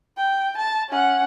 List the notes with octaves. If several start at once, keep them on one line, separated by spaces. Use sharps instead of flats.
G5
A5
C#4 F#5